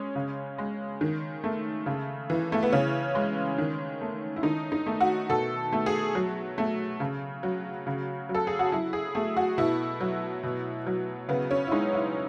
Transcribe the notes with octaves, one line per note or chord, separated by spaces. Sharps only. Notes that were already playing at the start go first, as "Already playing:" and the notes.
Already playing: G#3 C#4
C#3
G#3
D#3
A3
C#3
E3
A3
B3
C#3 C#4
G#3
D#3
A3
E4
D#3 D#4
D#4
A3
F#4
B2 A4
A3
G#4
F#3
A3
C#3
F#3
C#3
F#3
A4
G#4
F#4
F#3 E4
G#4
A3 G#4
F#4
B2 E4
F#3
B2
F#3
C#3 B3
C#4
E4
G#3 D#4
E4